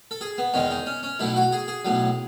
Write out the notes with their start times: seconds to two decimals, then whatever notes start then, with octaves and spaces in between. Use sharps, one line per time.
0.11 A4
0.21 G#4
0.38 B3
0.54 E2 D#3 G#3 C#4
0.71 D#4
0.86 C#4
1.03 C#4
1.19 B1 A2 F#3 E4
1.36 F#4
1.52 G#4
1.68 G#4
1.85 B1 A2 F#3